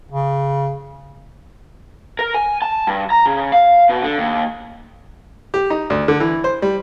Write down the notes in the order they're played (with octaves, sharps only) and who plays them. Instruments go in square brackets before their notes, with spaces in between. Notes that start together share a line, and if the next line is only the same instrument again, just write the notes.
[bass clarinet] C#3
[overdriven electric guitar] A#4
G#5
A5
G2
A#5
C#3
F5
B2
D3
D#2
[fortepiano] G4
D#4
D2
D3
E3
C5
G3